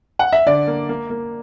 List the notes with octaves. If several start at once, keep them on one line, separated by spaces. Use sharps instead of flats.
F#5
E5
D3 D5
A#3
A#3
A#3